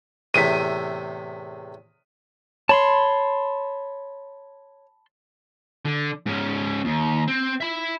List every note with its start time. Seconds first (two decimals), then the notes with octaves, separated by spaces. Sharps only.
0.34 E2 A2 C3 B6 D#7
2.69 C#5 A5 B5 C6
5.85 D3
6.26 G#2 C#4
6.85 D#2
7.28 C4
7.60 E5 B5